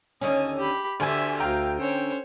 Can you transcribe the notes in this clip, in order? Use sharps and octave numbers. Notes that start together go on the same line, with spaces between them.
D#2 D3 C#4 D#5 G#5
G4 B5
D2 D3 G4 E5 G#5 G#6
D2 F5 G5 A#5
C#4 C5 C#5